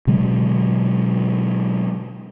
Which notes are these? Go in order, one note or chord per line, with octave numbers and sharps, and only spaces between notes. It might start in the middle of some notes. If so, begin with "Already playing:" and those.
B2 D3 F#3 G#3